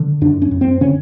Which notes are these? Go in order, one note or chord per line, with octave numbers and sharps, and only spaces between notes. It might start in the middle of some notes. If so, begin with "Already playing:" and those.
Already playing: D3
F#2 D4
C#4
F#2
C4
D3 C#4